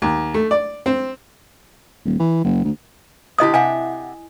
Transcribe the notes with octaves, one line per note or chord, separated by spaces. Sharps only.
D#2
A3
D5
C4
D#1
E3
F#1
D2
A#2 D3 E4 G4 D#5 D#6
C3 E5 F#5 G#5